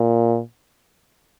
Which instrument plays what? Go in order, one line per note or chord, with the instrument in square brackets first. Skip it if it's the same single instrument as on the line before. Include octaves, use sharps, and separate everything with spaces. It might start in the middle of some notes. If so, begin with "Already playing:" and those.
Already playing: [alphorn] A#2